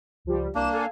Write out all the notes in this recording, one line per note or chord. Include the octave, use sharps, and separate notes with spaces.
C#2 F3 G3
C2 A#3 D4 E7
A4 F5 G#5